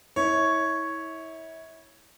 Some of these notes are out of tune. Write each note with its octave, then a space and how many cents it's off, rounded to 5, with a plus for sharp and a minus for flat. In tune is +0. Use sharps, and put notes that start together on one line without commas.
E4 -30 C#5 +0